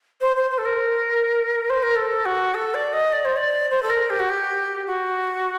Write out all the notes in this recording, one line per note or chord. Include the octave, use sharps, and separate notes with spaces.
C5
C5
C5
A4
A#4
C5
A#4
A4
F#4
A4
D5
D#5
D5
C5
D5
C5
A4
A#4
G4
F#4
G4
F#4